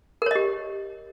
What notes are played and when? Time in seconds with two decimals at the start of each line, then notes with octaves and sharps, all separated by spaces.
0.22 A#4
0.26 C#5
0.31 D#5
0.35 G4